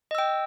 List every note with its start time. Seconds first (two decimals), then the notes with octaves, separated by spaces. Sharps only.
0.11 D#5
0.15 E6
0.18 G5